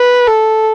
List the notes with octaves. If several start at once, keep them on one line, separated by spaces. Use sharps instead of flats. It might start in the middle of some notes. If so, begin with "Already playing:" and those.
Already playing: B4
A4